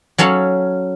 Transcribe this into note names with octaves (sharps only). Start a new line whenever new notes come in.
F#3 C#4 A4 C#5 F5